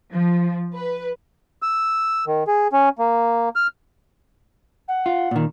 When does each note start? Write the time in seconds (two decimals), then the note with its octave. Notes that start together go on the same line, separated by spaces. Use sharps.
0.13 F3
0.75 B4
1.63 E6
2.27 D#3
2.48 G#4
2.73 C#4
2.99 A#3
3.56 F6
4.88 F#5
5.06 F4
5.31 A#2 D#3